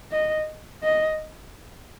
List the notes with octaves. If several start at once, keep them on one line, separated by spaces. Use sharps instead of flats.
D#5
D#5